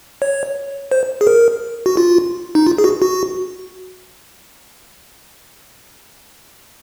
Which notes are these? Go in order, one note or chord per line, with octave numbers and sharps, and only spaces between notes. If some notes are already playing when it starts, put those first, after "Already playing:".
C#5
C5
G#4
A#4
F#4
F4
D#4
F4
G#4
F#4
F#4